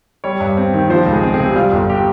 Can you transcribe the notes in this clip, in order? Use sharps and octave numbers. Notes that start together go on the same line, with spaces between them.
G3 C#5
G2
C4
D#3
F3 C5
C#2
G#4
C4
G#4
C3
G3 F4
G1 F4
G4